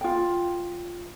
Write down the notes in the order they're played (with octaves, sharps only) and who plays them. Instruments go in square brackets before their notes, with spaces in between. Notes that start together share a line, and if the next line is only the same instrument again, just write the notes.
[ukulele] F4 G5